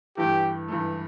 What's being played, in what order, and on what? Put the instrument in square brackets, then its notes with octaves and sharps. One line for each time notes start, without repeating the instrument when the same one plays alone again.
[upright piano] G2 E3 A3 [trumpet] G4
[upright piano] G2 E3 A3